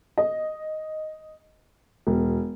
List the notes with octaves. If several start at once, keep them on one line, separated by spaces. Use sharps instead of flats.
D#5
E1